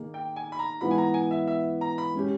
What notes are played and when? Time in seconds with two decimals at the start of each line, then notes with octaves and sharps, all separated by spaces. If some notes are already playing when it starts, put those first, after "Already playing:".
Already playing: D#3 A#3 D#4 G#4
0.14 G5
0.36 G#5
0.52 B5
0.59 A#5
0.81 E3 G#3 B3 E4 G#4 B5
0.91 G#5
0.98 A#5
1.14 G#5
1.31 E5
1.47 E5
1.81 A#5
1.98 B5
2.14 G#3 C#4 G4